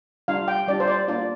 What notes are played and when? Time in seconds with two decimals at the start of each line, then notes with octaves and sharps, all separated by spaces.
0.28 G3 D4 F4 F5
0.48 G5
0.67 G3 D4 F4 D5
0.80 C5
0.88 D5
1.08 A#3 D4 F4 D5